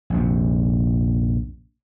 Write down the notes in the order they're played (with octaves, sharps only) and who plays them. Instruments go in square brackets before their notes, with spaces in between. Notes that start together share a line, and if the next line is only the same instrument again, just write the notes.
[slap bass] A#1 F2 C3